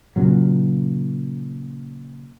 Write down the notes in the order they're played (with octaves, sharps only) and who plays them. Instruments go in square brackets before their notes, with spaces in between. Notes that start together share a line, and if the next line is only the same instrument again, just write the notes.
[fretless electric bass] A#2 C#3 F#3